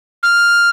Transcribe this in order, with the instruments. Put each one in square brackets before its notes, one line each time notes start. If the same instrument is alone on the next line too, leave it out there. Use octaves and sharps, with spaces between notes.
[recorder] F6